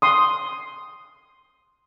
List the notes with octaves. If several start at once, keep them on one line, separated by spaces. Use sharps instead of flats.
G5 C6 D#6